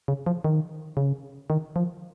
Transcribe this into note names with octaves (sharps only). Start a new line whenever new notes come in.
C#3
F3
D#3
C#3
D#3
F3